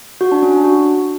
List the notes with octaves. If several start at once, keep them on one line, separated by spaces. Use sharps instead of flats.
F#4
D4
C#4
D4
F#4